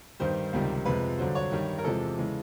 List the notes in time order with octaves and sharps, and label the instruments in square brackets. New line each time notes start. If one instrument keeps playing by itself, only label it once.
[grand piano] G2 D#3 G3 C5
C#2 C3 D#3 G3
F2 C3 F3 G#3 B4
G2 D3 F#3 C5
C#5
G2 D#3 G3
A#4
E2 C3 F3 G#3 A4
C#3 E3 G#3